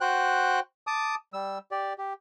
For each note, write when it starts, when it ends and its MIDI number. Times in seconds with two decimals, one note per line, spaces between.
0.01 0.60 66
0.01 0.60 72
0.01 0.60 79
0.01 0.60 90
0.87 1.15 81
0.87 1.15 86
0.87 1.15 87
1.33 1.58 55
1.33 1.58 88
1.71 1.93 67
1.71 1.93 74
1.98 2.13 67